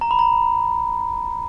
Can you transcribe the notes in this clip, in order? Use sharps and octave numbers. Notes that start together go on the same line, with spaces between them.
A#5
B5
A#5